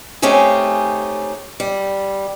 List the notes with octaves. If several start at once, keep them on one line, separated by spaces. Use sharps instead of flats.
A3 C4 C#4 D#4 G4 G#4
G3